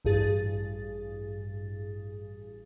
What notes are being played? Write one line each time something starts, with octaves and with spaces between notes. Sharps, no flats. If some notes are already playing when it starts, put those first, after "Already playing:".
A1 G2 G#4 A6